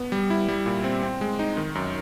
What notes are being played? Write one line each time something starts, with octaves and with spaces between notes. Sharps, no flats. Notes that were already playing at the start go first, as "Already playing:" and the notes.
Already playing: B3
G3
E4
G3
A#2
C4
C4
G#3
D#4
D#3
F#2